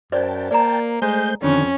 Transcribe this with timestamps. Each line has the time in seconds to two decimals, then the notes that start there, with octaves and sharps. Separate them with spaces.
0.12 F#2 C5 D5 G5 A5
0.51 A#3 D5 A#5
1.02 G#3 A3 C5 G6
1.43 F2 D3 D#3 C#4 D4